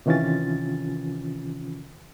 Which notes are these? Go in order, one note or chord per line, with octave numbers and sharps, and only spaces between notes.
C3 D#3 E3 C#4 F4 A6